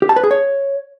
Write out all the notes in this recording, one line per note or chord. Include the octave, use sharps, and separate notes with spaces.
G4
A5
B4
G#4
C#5